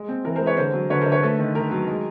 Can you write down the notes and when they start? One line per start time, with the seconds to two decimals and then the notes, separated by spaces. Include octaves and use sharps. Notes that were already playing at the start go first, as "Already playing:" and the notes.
Already playing: G#3
0.08 C4
0.24 E3 A#4
0.36 G#3 A#4 C5
0.46 B4 C#5
0.57 D3 A#4 C5
0.73 F#3
0.90 D3 B4 C#5
1.01 D3 A#4 C5
1.12 B4 C#5
1.22 A3 A4 B4
1.39 D#3
1.55 D#3 A#4
1.71 F#3
1.87 G#3